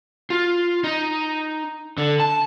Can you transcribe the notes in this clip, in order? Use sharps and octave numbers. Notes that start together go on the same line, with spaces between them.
F4
D#4
D3
A5